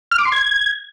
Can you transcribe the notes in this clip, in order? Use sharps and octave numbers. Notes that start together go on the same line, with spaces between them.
F6
D6
C6
G#6